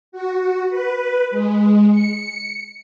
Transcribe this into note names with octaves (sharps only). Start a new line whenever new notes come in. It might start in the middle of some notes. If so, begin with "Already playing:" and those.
F#4
B4
G#3
C#7